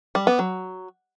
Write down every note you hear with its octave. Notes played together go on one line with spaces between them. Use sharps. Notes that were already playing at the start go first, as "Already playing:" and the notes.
G3
B3
F#3